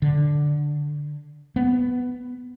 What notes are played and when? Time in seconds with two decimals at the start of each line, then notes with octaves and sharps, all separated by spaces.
0.02 D3
1.56 B3